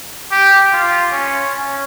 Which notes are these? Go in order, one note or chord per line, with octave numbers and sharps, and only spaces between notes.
G4
F4
C#4
C#4